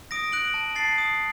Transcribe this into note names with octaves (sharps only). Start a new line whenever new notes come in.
D#6 A#6 D7
F#6 D7 F#7
A5
A5 A6 C7
D#6